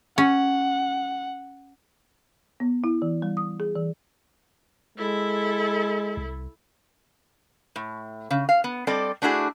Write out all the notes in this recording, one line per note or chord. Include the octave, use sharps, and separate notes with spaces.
C#4 F#5
B3
E4
E3
G3
D#6
G#4
E3
G#3 E4 A4
C2
A2
C#3
F5
B3
G3 C4 A4 D5 D#5
A3 D4 E4 F#4 G#4